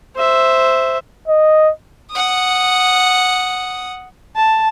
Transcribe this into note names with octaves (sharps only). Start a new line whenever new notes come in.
C5 E5
D#5
F#5 D#6
A5